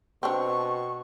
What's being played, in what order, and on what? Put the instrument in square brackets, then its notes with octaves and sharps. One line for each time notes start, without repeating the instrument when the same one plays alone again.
[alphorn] B2 [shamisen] C4 D4 [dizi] C#6